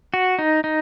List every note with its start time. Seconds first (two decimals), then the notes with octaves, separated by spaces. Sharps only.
0.14 F#4
0.39 D#4
0.64 D#4